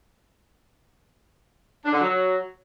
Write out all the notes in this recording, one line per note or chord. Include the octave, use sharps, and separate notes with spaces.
D4
D3
F#3